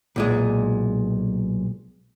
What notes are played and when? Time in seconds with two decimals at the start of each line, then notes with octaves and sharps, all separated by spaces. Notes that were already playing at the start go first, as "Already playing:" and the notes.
0.16 B1 A#2 G#3